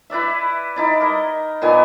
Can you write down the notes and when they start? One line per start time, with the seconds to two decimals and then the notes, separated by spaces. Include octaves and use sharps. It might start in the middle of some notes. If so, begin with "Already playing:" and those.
0.10 E4 B4 D5 E5
0.76 D#4 E4 D5
1.01 A#4 D#5
1.62 A#2 D#3 B3 G#5